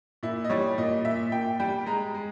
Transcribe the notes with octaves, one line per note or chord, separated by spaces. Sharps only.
A#2 E4
D#5
G3 C#5
A#2 D#5
A#2 E5
A#2 G5
G3 G5
G#3 A#5
G#3